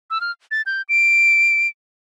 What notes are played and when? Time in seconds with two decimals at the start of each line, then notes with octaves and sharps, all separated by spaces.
0.10 E6
0.21 F6
0.51 A6
0.66 G6
0.89 D7